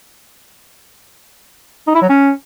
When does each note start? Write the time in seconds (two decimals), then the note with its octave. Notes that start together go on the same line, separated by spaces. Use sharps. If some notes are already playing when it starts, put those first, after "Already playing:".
1.87 D#4
1.95 E4
2.02 F#3
2.09 C#4